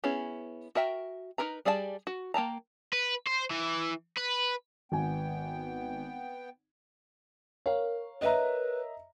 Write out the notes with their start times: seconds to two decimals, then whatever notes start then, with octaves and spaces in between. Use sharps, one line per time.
0.04 B3 C#4 E4 G#4
0.75 F#4 A#4 E5 G5
1.38 D#4 F4 A#4 B4 A#5
1.65 G3 G#4 D5 F#5 A5
2.07 F#4
2.34 A#3 G5 A5 A#5
2.93 B4
3.27 C5
3.50 E3
4.17 B4
4.92 G#1 B3 G5 G#5
7.66 A#4 C#5 F5
8.21 B4 D#5 E5 A#5